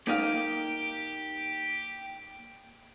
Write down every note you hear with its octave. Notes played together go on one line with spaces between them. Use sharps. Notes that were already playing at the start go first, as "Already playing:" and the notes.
A#3 D#4 G4 F5